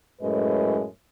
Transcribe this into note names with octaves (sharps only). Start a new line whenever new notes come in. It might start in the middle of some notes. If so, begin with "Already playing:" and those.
F#2 A2 G#3 B4 D#5